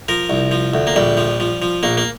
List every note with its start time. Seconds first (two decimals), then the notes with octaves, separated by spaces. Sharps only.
0.08 F3 A#4
0.30 C2
0.51 F3
0.74 D2
0.87 A#3
0.96 A#1 G3
1.17 F3
1.40 F3
1.62 F3
1.83 A#1 A#3
1.97 A#3